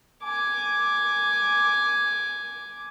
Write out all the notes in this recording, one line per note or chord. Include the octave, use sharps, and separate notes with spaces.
G#5 D6